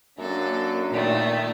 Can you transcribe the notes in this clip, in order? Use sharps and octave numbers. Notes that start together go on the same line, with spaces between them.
F#2 A#3 C#4 D4 A4
A#2 D#3 A3